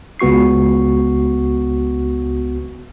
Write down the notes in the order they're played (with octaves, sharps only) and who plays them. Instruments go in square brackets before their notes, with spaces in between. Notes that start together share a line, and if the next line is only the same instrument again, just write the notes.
[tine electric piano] C#2 B3 F#4 C#6 C7